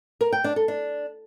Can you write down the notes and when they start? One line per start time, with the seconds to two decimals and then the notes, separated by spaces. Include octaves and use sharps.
0.21 A#4
0.32 G5
0.44 D4
0.56 A4
0.68 D4